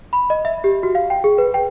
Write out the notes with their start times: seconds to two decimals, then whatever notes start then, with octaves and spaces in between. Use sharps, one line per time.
0.13 B5
0.30 D#5
0.45 E5
0.64 G4
0.83 F#4
0.95 F5
1.10 G5
1.24 G#4
1.38 B4
1.54 G5